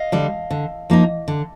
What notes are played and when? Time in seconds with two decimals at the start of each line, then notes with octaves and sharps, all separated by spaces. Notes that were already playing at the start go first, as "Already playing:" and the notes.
Already playing: D#5 F5
0.12 D3 G3
0.51 D3
0.90 F3 A#3 D#4
1.28 D3